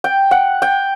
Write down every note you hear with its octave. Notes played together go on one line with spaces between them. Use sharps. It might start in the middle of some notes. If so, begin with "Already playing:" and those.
G5
F#5
G5